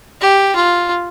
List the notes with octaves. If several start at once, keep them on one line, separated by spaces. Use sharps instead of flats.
G4
F4